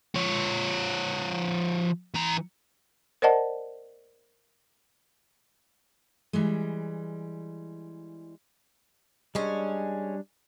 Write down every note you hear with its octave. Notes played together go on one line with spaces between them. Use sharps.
F3 C#5
E3 A#5
A#4 C5 D5 D#5 F#5 A5
E3 G3 G#3
G3 G#3 C#4 D4